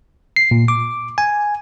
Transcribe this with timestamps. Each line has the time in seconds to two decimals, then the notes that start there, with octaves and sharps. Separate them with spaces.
0.36 C7
0.51 A#2
0.68 D6
1.18 G#5